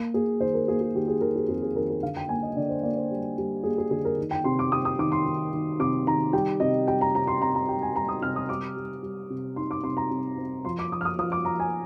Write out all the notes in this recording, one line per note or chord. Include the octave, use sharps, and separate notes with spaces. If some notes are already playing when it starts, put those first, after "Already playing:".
Already playing: A#3
A#3 G#4
D#3 C5
A#4
A#3 G#4
G#4
D#3 G4
G#4
D#3 A#4
G#4
F2 G#4
G#4
D#3 A#4
A#4
D3 F5
G5
A#3 G#5
D#5
D3 D5
C5
A#3 D5
C5
G3
G3
A#3 G#4
G#4
D3 G#4
A#4
D#3
G5
C3 C6
D6
C3 D#6
D#6
D#3 D6
C6
D#3
D#3
C3 D6
D#3 A#5
G3 G5
C3 D#5
G3 G5
A#5
C3 A#5
C6
C3 A#5
A#5
G3 G5
G#5
G3 A#5
D#6
C3 F6
D#6
G3 D6
G3
G3
C3
D#4 C6
D6
C3 C6
A#5
C3
C4
F3 C6
D6
F3 D#6
F6
D#6
F3 D#6
D6
F3 A#5
G#5